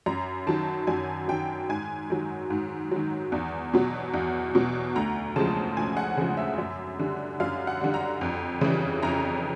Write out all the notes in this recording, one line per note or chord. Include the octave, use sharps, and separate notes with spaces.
F#2 A#5
D#3 F#3 A5
F#2 G#5
D#3 F#3 G5
G#2 G#5
D#3 F#3
G#2
D#3 F#3
E2
B2 F#3
E2
B2 F#3
D2 A#5
C#3 F3 G#3 A5
D2 G#5
F#5
C#3 F3 G#3
E5
F#2
D3 G3
F#2 F5
F#5
D3 G3
A#5
F2
C#3 E3 G3
F2 A#5